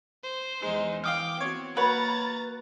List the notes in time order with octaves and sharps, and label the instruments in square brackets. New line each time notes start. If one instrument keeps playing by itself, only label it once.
[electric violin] C5
[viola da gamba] E2 D#4 [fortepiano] G#3
[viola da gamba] E3 [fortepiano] F5 D#6 F6 [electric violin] G5 D6
[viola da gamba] B3 F#4 [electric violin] C4 [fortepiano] C#5
[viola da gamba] A#3 F#4 [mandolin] B4 [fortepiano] C#5 F#5 [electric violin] A#5 A6